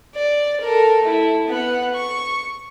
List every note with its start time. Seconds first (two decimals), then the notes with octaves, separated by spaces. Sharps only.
0.15 D5
0.61 A4 A#4
1.03 A3 E4
1.47 B3 F#5
1.95 C#6